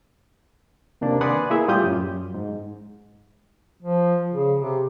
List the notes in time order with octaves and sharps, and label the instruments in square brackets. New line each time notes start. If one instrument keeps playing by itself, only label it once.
[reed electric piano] D#2 C3 A#3 D4
B4 D5 F#5 G#5 C6 D#6
A#3 E4 G#4 E5
A2 G3 F4 G4 D#6 G6
F#2
G#2
[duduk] F3
C#3
C3